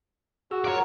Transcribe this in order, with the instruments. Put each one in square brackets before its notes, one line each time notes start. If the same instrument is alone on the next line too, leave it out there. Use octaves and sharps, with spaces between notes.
[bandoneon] F#4 [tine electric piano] G#4 E6
[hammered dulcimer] F#3 F4 A#4 [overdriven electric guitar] C#5 D5